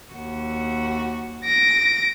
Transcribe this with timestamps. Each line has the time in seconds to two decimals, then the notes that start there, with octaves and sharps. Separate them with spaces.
0.12 D#2 F#4
1.45 A#6 D7